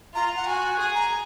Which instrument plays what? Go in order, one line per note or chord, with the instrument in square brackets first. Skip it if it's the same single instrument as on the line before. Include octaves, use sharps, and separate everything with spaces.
[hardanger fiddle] F4 [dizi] A#5
[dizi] F#5
[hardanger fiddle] F#4 [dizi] G#5
[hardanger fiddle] G#4 [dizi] G#5
[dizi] A#5